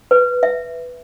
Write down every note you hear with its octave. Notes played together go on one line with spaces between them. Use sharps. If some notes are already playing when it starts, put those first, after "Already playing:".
B4
E5